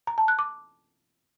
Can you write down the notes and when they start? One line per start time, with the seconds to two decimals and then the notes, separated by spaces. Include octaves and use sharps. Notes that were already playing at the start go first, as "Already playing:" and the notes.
0.07 A#5
0.18 A5
0.28 F#6
0.39 D6